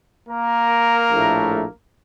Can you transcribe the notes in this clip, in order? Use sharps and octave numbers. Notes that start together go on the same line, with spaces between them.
A#3 A#4
A#1 A2 A3